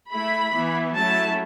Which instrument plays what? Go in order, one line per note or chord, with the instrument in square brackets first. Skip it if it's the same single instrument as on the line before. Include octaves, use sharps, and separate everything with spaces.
[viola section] A3 E4 B5
E3 B3 E4
F#3 A3 C#4 E4 A5